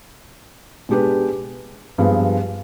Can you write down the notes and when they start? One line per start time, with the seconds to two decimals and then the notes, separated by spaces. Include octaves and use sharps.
0.89 B2 G#3 D4 G4 B4
1.98 G2 F3 G#3 B3